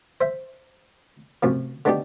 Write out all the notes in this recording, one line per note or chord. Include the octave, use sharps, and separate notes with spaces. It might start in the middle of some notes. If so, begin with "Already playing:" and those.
C5 E5
F#2 A2 C3 F3
D3 A3 B3 D4 D#4 G4